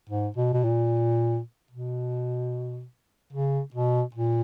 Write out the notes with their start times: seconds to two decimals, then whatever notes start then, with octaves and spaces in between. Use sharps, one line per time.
0.09 G#2
0.36 B2
0.53 B2
0.64 A#2
1.71 B2
3.33 C#3
3.74 B2
4.15 A#2